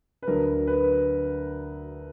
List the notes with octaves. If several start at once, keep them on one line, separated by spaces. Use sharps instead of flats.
B4
D2 D3 F#3 A#4
B4